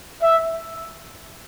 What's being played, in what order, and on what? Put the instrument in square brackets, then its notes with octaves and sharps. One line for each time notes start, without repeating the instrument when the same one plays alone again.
[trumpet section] E5